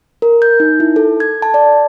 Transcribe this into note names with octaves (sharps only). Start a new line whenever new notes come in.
A#4
G6
D#4
E4
A4
G#6
A5
D5